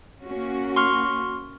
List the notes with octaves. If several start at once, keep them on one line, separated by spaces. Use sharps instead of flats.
A#3 C#4 F#4
C6 C#6 F6